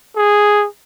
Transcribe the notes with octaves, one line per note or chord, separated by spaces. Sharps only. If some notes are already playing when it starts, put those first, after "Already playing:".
G#4